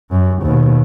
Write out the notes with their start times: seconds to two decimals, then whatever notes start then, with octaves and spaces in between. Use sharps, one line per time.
0.11 F#2
0.42 D#2 B2